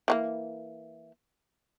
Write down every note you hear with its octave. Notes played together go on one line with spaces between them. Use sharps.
E3 F#3 A#3